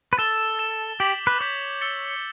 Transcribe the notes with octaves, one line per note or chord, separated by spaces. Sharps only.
B4
A4 A6 E7 G7
A6 E7 G7
G4 D6 G6 B6 F#7
B4
C#5 D6 G6 B6 F#7
E6 A6 C#7 G7